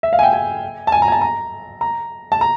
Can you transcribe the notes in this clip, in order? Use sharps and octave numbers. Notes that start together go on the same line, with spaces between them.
E5
F5
G#5
G5
G#5
A5
G#5
A#5
G#5
A5
A#5
A#5
A5
A#5